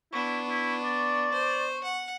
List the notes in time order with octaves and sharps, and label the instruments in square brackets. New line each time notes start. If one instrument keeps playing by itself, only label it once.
[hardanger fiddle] B3 D4 [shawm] E4 [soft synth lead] C#6
[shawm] E4
D5
[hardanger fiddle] C5
F#5